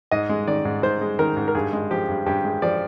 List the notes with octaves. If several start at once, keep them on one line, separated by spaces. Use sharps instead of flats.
G#2 D#5
G#3
D#3 D5
G#2
G#2 C5
G#3
D#3 A#4
G#2
A#4
G2 G#4
G#3
F3 G4
G2
G2 G4
G#3
F3 D5